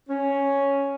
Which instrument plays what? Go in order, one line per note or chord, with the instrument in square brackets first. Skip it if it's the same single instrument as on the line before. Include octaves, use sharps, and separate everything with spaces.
[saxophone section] C#4